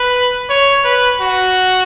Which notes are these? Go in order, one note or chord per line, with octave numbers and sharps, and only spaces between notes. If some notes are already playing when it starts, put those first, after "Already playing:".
Already playing: B4
C#5
B4
F#4